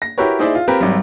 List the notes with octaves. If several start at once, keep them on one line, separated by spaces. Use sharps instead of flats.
A#6
E4 F#4 G4 A#4 B4 C#5
D#4 E4 G#4 C5 D5 E5
F4
C4 F4 G4 A#4 B4
G#1 F#3 G3